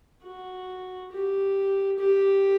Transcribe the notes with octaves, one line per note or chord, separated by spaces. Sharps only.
F#4
G4
G4